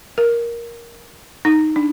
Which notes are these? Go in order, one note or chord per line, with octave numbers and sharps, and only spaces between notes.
A#4
D#4
D4